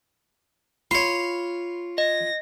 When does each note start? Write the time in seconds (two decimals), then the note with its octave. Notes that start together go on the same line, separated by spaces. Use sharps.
0.91 F4 C#5 B5 C6
1.98 D#5 A#6